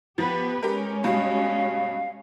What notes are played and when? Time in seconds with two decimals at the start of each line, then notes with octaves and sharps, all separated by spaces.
0.18 F3 B3 G4 B4 A6
0.63 G#3 C#4 G4 A#4
1.04 G2 B2 F5